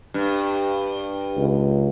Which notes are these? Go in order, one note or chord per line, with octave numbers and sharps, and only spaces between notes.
G2
C#2